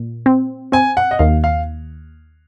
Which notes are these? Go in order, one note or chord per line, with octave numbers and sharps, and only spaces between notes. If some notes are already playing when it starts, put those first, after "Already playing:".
Already playing: A#2
C4
C4 G#5
F#5
D#5
D#2 F5
F5